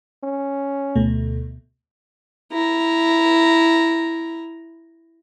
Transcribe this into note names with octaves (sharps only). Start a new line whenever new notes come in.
C#4
D2 B2 A3
E4 A#5